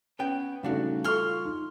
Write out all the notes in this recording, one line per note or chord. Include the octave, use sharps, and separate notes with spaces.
B3 C#4 G5
C#3 G3 A3 D4 D#4 F#4
F4 A4 C6 C#6 F6
D#4